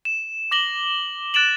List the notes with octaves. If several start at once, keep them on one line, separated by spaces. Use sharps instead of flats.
E7
D6 A#6 F#7 G7
F#6 A6 D7 E7 F#7